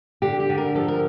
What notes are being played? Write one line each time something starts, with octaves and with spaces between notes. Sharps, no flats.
D3 G4
G4
D3
A#4
F3 A4
A#4